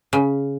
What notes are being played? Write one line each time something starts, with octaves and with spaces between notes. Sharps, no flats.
C#3